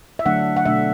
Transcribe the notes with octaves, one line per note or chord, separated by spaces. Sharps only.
E5
D3 F#3 A3 D4 F#5
F#5
B2 A3 D4 E5